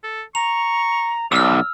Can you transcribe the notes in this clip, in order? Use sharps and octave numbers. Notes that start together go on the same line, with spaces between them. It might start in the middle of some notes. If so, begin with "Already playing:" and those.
A4
A#5 C#6 F7
B1 D5 E6 F6